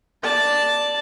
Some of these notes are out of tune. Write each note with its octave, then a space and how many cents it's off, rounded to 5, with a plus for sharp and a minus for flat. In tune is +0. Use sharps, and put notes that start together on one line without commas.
D5 +0 A5 +0